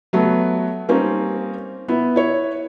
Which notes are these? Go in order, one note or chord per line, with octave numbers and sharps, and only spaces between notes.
F#3 A3 B3
G3 A#3 C4 C#4 D#4
B3 E4
E4 C#5